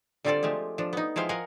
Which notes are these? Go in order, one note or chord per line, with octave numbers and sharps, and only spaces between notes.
D3 G3 C4 F4 A4 D5
F3 G#3 A3 G4
F3 D4
B3 D#4
F3 G#3 E4 F5 G5
A#4 D#5 F5 F#5 G#5